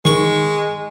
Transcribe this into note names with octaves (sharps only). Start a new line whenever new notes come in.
D#3 G#3 C#6